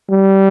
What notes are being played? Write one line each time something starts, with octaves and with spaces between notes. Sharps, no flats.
G3